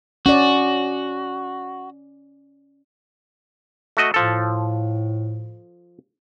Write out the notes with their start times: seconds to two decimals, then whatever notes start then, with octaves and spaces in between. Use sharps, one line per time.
0.26 C#4 F#4 D5
3.97 A3 F#4 D#5
4.14 A2 F3 A4